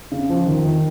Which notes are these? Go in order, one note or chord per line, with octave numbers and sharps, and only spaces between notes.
C#3
F3
D#3
D#3